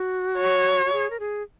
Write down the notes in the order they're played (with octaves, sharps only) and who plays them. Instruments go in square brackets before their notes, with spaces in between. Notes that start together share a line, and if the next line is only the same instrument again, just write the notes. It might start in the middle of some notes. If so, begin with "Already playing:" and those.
Already playing: [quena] F#4
[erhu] C#5
[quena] F#4
G#4
A#4
G#4